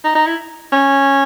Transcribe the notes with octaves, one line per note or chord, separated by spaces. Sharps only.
D#4
D#4
E4
C#4